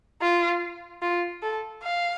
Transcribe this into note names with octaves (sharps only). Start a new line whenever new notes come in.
F4
F4
A4
F5